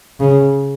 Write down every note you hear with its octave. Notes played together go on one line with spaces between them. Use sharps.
C#3